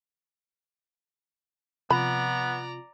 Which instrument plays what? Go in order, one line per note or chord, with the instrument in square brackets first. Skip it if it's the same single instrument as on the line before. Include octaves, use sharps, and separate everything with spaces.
[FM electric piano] C3 F3 F4 [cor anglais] B3 [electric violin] D5 A#5 [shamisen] B5